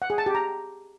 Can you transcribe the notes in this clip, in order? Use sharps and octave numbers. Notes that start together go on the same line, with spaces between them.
F#5
G#4
A5
G4
A#5